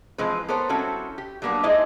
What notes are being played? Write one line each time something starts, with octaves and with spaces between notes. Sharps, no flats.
E3 F3 G#3 C4 B4
B3 A4 A#4 C5 C#5
G3 C4 C#4 E4 F#4 A4
G4
F#3 G3 A#3 B3 D4
G#3 D#4 E4 G#4 C5 D#5